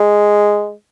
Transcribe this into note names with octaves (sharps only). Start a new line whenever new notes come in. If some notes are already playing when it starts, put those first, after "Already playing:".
Already playing: G#3